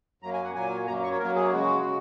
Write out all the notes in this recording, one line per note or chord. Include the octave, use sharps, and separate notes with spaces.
F#2 F#3 A#3 A#5
G#5
F#5
A#2 F#3 A#3 G#5
F#2 F#3 A#3 A#5
C#6
C#5
F#2 F#3 A#3 A#4
G#4
C#3 G#3 F#4
C#3